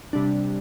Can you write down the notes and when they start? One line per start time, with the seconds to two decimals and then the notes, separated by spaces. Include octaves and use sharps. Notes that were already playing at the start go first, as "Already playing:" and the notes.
0.13 C3 G3 D4